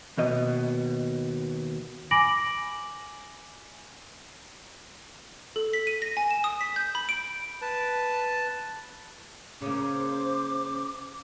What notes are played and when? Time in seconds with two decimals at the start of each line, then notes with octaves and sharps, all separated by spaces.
0.18 D#2 B2 D#5
2.11 G#5 B5 D6 A#6 D7 F#7
5.56 A4
5.73 B6
5.87 D#7
6.02 A#6
6.17 G#5
6.31 E7
6.44 D#6
6.61 B6
6.76 G6
6.95 B5
7.09 D7
7.61 B4 A5
9.62 C#3 A#3 C#4 C5 D6